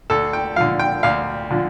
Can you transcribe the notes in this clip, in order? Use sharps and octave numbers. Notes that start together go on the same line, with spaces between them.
D2 A4
G5
D3 F3 F5
G5
D2 F5
D3 F3